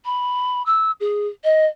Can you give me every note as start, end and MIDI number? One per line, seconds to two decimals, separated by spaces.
0.05 0.62 83
0.66 0.91 88
1.00 1.27 68
1.44 1.66 75